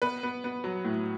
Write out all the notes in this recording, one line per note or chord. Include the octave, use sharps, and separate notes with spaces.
B3 B4
B3
B3
F#3
A2